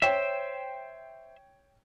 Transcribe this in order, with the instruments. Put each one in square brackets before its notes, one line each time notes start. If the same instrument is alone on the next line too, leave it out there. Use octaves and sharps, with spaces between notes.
[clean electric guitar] C5 E5 [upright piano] C#5 G5